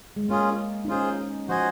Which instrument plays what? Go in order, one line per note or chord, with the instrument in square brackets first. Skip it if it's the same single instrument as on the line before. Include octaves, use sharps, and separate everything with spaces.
[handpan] G#3
[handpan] A#3 [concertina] C#4 F4 G#4
[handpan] D#4
[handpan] C#4 [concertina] F4 G#4 C5
[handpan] F3 [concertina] F#4 C5 D#5 G#5